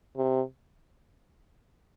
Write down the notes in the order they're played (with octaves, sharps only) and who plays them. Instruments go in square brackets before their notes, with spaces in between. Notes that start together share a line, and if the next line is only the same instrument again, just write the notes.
[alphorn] C3